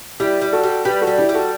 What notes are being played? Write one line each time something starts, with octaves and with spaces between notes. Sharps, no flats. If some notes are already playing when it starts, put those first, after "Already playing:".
G3 E4 G4
G3
F#4 A4
G3
G3 G4 B4
F#4 A4
G3
E4 G4
G3
F#4 A4